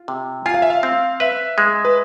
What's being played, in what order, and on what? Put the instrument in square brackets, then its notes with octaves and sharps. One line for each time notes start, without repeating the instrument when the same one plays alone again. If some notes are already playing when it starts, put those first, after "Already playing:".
Already playing: [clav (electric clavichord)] F4
C3
[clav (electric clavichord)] F4 [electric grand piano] G#5
[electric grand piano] F5
E5
F5
[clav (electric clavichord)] C4
[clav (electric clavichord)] B4 [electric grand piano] E5
[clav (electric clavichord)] G#3
[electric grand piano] B4